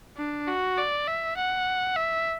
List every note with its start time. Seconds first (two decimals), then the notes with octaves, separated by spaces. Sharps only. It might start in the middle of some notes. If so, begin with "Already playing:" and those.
0.17 D4
0.48 F#4
0.77 D5
1.07 E5
1.37 F#5
1.96 E5